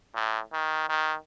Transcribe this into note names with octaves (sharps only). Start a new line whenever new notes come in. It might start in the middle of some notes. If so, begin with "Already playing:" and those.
A2
D#3
D#3